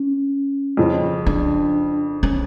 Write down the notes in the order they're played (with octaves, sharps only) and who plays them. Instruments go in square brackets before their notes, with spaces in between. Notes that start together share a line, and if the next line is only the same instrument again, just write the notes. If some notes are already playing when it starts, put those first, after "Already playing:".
Already playing: [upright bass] C#4
[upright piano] F2 C#3 F3
[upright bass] D4
C#4